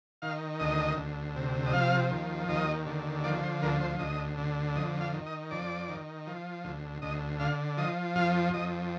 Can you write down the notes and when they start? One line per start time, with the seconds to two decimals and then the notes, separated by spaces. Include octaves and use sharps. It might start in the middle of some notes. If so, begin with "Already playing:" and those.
0.22 D#3 F5
0.60 D2 D#5
0.97 D2
1.36 C3
1.66 D#5
1.72 F3 F5
2.11 D#2
2.48 D#2 D#5
2.86 D3
3.24 F3 D5
3.43 C5
3.62 D2 A#4
3.81 C5
3.99 D2 D#5
4.38 D3
4.75 F2 D#5
5.01 F5
5.13 D#3
5.26 D#5
5.51 F2 D5
5.88 D#3
6.27 F3
6.64 D2
7.02 D2 D#5
7.39 D3 F5
7.77 F3 D#5
8.16 F2 F5
8.54 F2 D#5